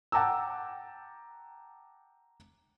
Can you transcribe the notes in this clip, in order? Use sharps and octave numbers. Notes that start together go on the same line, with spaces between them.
F#5 G5 A5 A#5 D6 E6